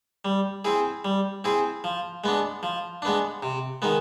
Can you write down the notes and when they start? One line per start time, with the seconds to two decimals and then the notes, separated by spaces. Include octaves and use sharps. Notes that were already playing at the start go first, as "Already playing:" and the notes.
0.25 G3
0.65 C4 E4 G#4
1.05 G3
1.44 C4 E4 G#4
1.84 F3
2.24 G#3 B3 D4
2.63 F3
3.02 G#3 B3 D4
3.43 C3
3.82 D#3 G#3 B3